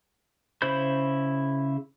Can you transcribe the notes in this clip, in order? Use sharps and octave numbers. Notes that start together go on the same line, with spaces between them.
C#3 E4 C5 B5 G6